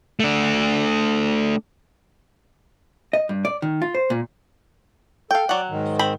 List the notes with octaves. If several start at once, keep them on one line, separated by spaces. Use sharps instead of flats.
A3 D4
D#5
G2
D5
D#3
F4
C5
A#2
A4 F5 G5
F#3 D5 F#5
G#2 D#3
C4 B5